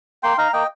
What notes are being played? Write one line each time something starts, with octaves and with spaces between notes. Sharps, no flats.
A#3 G5 C6
D#4 F5 A#5
A#3 D#5 G5